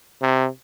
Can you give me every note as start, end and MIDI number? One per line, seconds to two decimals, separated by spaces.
0.22 0.47 48